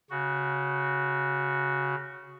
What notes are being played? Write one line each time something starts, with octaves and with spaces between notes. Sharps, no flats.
C#3 F#4